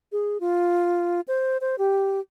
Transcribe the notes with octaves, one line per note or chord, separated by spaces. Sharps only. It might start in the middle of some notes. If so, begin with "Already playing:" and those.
G#4
F4
C5
C5
G4